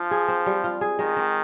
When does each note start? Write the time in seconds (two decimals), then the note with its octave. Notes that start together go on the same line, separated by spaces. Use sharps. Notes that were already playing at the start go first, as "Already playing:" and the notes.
Already playing: F3 F4
0.11 G#4
0.28 C4
0.46 G3
0.64 F4
0.81 G#4
0.99 D#3 G#3
1.16 C4